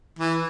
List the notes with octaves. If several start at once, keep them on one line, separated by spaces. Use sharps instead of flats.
E3